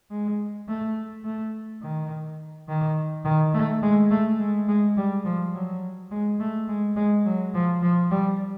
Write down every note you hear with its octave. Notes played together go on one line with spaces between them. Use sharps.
G#3
A3
A3
D#3
D#3
D#3
A3
G#3
A3
G#3
G#3
G3
F3
F#3
G#3
A3
G#3
G#3
F#3
F3
F3
G3